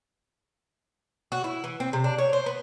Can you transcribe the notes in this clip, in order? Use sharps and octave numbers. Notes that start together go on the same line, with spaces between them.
F#4
E4
E3
C4
C3
D4
C#5
C5
B3